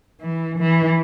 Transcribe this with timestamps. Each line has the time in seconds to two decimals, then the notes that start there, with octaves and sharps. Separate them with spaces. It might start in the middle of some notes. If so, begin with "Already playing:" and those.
0.22 E3
0.59 E3